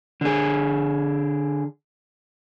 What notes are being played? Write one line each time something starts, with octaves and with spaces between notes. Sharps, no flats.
D3 G#4